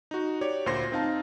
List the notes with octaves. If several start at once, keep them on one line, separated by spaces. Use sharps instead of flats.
D#4 F#4
G4 C#5 D5
D2 A#2 C5 C6 A#6
C4 D#4 F5 A5